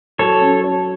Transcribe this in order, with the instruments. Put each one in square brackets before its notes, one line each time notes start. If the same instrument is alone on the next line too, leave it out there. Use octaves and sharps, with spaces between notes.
[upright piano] F#3 [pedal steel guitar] A4 C#5
[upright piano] C#4
C#5